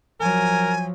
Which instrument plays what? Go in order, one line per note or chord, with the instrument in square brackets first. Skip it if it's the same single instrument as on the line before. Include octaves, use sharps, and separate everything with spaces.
[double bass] F3 F#3 [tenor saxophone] A#4 [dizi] G#5